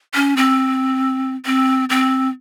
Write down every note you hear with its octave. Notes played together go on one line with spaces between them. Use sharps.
C#4
C4
C4
C4